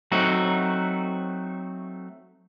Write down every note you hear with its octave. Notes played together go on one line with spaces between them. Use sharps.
F#3 A3 C4 D#4 F#4